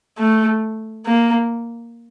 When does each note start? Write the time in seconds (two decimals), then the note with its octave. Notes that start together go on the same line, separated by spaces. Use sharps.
0.18 A3
1.06 A#3